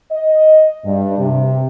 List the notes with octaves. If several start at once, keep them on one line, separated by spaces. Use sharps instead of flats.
D#5
G2
C3